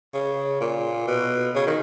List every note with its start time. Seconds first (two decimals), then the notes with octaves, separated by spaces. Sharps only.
0.14 C#3
0.61 A#2
1.08 B2
1.55 C#3
1.67 D#3